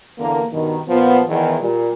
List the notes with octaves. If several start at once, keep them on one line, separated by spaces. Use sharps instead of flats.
E2 D3 A#3
G2 B2 D#3
A#2 F3 B3
E2 D#3
A#2 G3